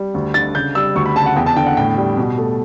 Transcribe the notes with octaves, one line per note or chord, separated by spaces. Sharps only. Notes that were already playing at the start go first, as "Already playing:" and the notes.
Already playing: G3
D2
D3 A6
C#3 G6
G3 E6
D2 C#6
B5
C#3 A5
F#5
E2 G5
A5
D3 G5
F#5
A2 G5
G3
B2
A3